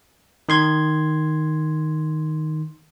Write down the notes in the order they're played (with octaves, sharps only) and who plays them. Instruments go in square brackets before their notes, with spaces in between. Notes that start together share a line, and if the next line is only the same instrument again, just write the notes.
[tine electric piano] D#3 C6 G#6